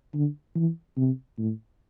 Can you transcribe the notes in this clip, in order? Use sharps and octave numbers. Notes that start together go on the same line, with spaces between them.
D3
E3
C3
A2